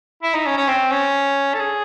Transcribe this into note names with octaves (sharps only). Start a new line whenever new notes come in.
E4
D#4
C#4
C#4
C4
C#4
A4
G#4